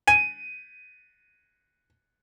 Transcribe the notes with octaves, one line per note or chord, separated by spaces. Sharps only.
G#5 D#7